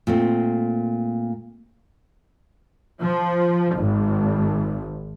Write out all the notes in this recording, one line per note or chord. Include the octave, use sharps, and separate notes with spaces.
A#2 A3 C4
F3
G#1